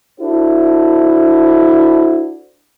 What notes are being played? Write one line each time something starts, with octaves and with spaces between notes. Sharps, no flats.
D4 E4 F#4 A4 C5